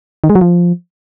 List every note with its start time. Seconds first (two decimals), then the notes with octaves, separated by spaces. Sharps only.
0.24 D#3
0.29 G#3
0.35 F#3
0.41 F3